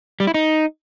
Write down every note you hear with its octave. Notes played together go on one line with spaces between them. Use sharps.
G3
E4
D#4